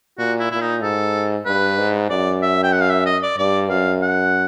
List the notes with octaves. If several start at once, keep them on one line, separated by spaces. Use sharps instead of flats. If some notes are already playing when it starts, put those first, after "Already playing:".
A#2 F#4
E4
A#2 E4
D#4
G#2 A4
G2 B4
G#2
F#2 D5
E5
G5
F#5
F5
E5
D#5
D5
G2 D5
F#2 F5
F#5